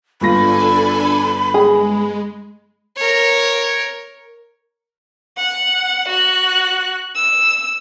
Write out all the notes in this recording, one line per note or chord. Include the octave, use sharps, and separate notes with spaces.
G1 D4 F4 A4 G#5 B5 A#6
G#3 G#4
A#4 C#5
F#5
F#4 F#6
E6